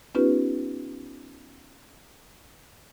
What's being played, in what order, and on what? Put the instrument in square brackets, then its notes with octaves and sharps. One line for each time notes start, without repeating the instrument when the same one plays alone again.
[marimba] B3 C#4 D#4 F4 G4 B4